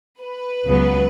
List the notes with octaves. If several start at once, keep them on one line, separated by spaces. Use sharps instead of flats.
B4
C#2 C#3 F#3 B3